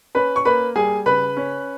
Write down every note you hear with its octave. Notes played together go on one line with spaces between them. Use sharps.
C#4 B4 B5
C#6
A#3 B4 B5
G3 G#4 G#5
C#3 B4 B5
C#4